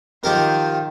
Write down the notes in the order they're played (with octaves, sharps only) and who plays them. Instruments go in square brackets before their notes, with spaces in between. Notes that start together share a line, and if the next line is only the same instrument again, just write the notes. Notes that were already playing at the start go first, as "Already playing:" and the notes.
[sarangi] D#3 [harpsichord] F3 G4 A#4